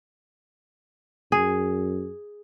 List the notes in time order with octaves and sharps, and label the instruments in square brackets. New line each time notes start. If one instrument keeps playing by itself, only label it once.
[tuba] F#2 [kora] G#4